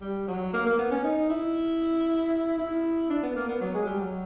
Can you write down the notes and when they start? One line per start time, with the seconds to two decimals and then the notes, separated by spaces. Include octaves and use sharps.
0.01 G3
0.28 F#3
0.53 A#3
0.66 A#3
0.78 B3
0.91 C#4
1.04 D#4
1.29 E4
2.58 E4
3.10 D4
3.23 B3
3.35 A#3
3.48 B3
3.61 F#3
3.74 G#3
3.86 G3
4.00 F#3